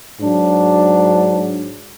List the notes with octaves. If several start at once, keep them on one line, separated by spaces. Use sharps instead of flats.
G#2 F#3 D4